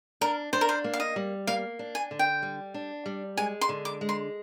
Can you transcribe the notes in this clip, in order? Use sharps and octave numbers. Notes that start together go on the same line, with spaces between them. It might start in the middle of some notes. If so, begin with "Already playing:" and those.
D4 A#4
D4 C5
A#4
C5
A#3
F5
D#5
G3
A#3 F5
D4
G#5
D3
G5
G3
D4
G3
G#3 G#5
C6
D3
D6
G#3
C6